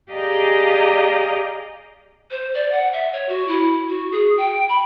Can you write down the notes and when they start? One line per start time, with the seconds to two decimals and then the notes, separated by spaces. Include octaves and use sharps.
0.11 G4 G#4 D5 D#5 F5 A#5
2.31 C5
2.54 D5
2.72 F#5
2.93 E5
3.13 C#5
3.29 F#4
3.48 E4
3.89 F#4
4.12 G#4
4.38 G5
4.69 B5